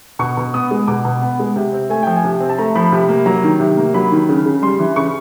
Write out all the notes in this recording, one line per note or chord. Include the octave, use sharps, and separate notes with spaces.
B2 C#6
B2
B3 D#6
G#3
B2 D6
B2
B3
G#3
C3
C4
A3 G#5
F3 G5
G#5
C3
C4
A5
A3 A#5
F3 B5
C3
A#3
F#3 A#5
D#3
C3
A#3
F#3 B5
D#3
C#3
C#3
G3 C6
E3
C#3 C#6